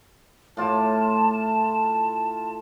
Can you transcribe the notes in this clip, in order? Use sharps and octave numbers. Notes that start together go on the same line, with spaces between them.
A2 F4 A5 D6